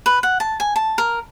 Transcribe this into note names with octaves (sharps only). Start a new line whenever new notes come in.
B4
F#5
A5
G#5
A5
A#4